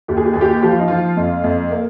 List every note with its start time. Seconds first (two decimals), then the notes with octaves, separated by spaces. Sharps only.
0.08 D#2 G4
0.17 G#4
0.25 G4
0.33 D#2 G#4
0.41 G4
0.62 F3 G4
0.71 F4
0.79 D#4
0.88 F3 F4
1.17 F2
1.44 F2
1.71 A#3